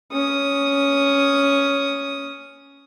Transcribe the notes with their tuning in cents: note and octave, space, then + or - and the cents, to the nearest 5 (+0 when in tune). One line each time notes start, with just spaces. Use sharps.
C#4 +10 D#6 +0